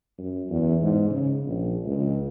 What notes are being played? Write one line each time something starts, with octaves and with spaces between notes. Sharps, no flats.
F#2
E2
G#2
C#3
A#1
C#2